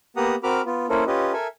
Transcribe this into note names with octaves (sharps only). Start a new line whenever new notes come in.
A#3 B3 G4 F#5 A#5 D#6
C4 F#4 A#4 B5 D6 F6
B3 F4
A#3 C#4 E4 A4 A#4 C5
C#4 F4 G4 B4 D#5
A4 A#4 E5 G#5